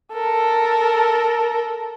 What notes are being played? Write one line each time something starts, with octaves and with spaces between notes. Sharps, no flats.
A4 A#4